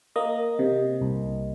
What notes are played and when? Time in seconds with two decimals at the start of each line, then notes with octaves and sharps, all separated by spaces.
0.16 A#3 D#5
0.59 C3
1.01 C2